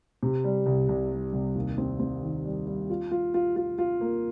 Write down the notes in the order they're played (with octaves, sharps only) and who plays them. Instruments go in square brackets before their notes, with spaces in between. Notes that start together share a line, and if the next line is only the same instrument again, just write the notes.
[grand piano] C3
G3
C2
C2
G3
C2
D#2
C4
C4
D#3
G3
G3
F4
F4
F4
F4
F4
A#3